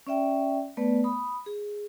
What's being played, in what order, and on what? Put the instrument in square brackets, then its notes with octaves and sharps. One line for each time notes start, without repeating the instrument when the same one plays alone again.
[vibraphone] C#4 D5 E5 G5
A3 B3 B4 D5
B5 D#6
G#4